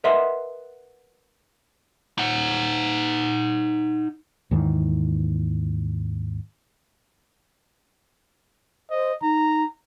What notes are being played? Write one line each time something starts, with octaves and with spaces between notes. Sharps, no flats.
A#4 B4 D#5 E5 F#5 C6
D#4 F#5
D#2 G#2 D#3 E3
C5 D#5
D#4 A#5